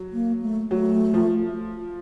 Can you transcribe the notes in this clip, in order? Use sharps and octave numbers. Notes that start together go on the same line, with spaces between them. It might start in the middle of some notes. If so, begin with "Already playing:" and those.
Already playing: F#3
A#3
A3
F#3 A3
F3